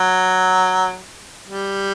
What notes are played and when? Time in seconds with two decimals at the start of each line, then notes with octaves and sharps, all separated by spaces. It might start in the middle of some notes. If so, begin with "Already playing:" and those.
Already playing: F#3
1.46 G3